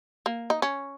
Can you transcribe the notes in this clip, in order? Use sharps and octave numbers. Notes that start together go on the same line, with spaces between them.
A#3
D#4
C#4